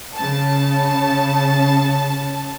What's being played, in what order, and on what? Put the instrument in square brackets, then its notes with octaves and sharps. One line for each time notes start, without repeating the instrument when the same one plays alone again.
[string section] C#3 A5